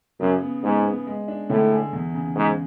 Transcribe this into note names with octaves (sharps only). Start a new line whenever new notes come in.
F#2 C#3
B3
G#2 B3
B3
G#3
D4
A2 D3
G#4
E2
C#3
G#2 C#3